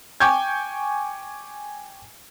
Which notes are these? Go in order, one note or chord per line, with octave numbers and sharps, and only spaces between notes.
G5 G#5 C#6 D6 G6 G#6